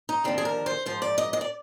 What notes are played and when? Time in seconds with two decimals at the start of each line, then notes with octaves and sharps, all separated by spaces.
0.09 D#4
0.24 D#2 D3 F3 C4
0.38 G#4
0.45 A#4
0.66 C5
0.86 G#2 F3 C5
1.02 D5
1.18 D#5
1.33 D#5
1.41 D5